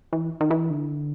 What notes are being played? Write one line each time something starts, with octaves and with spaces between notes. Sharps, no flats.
E3
D#3
E3
D3